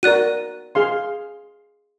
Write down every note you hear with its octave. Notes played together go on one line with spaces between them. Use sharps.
F#4 A#4 D5 F#6 D#7
G#4 F5 C6